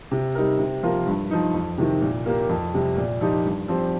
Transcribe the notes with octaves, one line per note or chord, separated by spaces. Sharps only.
C3
G3 D#4 A#4
C3
F3 A#3 F4 A#4
G2
F3 D#4
F2
C3 D#3
A#2
A#3 G4 A#4
F2
C3 G3
A#2
F3 D#4 G4
G2
F3 C4 G4